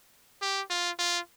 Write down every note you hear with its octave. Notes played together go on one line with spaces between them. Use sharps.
G4
F4
F4